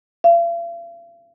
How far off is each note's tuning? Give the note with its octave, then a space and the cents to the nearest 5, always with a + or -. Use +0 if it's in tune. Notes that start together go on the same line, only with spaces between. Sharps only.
F5 -45